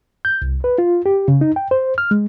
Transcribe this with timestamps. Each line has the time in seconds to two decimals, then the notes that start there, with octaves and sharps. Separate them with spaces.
0.25 G6
0.42 C2
0.64 B4
0.78 F4
1.06 G4
1.28 C#3
1.41 D#4
1.56 G5
1.71 C5
1.98 F6
2.11 G#3